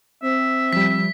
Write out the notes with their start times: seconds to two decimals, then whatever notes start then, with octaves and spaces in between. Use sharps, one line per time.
0.23 C4 E5
0.73 F3 G3 B6